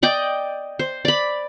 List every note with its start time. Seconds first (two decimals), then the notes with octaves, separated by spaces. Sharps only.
0.03 D5 D#5 G5
0.79 C5
1.05 D5 B5